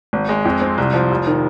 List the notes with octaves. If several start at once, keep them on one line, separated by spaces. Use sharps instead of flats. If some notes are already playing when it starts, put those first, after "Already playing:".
G#1
G#3
F2
C4
C2
F3
F1
D#3